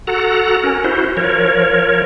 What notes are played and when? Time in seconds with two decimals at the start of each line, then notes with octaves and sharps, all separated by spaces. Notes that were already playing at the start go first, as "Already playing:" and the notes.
0.07 F#4 A4 F#5 A#5
0.63 C#4 A#4
0.84 E4 F#4 C5
1.17 F3 A#4 C#5